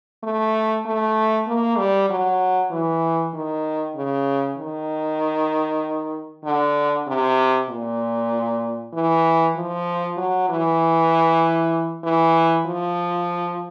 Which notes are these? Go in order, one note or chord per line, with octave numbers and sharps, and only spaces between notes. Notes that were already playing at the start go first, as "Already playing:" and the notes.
A3
A3
A#3
G3
F#3
E3
D#3
C#3
D#3
D3
C3
A#2
E3
F3
F#3
E3
E3
F3